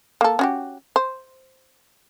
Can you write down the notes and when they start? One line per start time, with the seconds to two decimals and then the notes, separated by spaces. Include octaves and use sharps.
0.21 A#3 A4
0.39 C#4 F#4 G4
0.96 C5